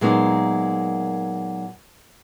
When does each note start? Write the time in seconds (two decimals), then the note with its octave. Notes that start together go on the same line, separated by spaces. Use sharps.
0.01 A#2 F#3 G#3 A#3 B3 D#4